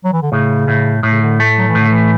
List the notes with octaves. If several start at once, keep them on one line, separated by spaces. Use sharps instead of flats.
F#3
E3
D3
A2 C#3
A2
A2
C#3
D3
A3
F#3
E3
A2 D3
E3